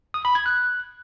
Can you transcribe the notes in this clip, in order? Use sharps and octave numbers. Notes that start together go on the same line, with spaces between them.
D#6
B5
G#6
F#6